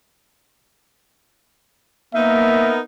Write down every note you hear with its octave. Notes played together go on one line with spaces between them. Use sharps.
A#3 B3 D#4 A#4 E5